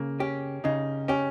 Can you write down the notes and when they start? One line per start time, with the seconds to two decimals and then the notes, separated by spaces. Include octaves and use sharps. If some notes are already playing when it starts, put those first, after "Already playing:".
Already playing: C#3 A#3
0.20 C#4 G4
0.64 C#3 D#4
1.08 C#4 G4